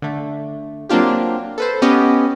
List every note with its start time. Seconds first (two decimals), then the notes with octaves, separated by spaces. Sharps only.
0.02 D3 A3
0.89 F#3 A#3 C4 D4 F4 G4
1.58 A4 B4 C5
1.82 B3 C#4 G4 D#5